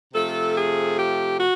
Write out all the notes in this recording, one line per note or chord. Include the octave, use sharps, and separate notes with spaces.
C3 F3 A3 A4
G#4
G4
F#4